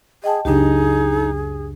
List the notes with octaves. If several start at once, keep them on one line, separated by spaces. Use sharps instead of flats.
G#4 D#5 G5 A5
C#2 F#2 C#3 D4 D#4 G4 G#4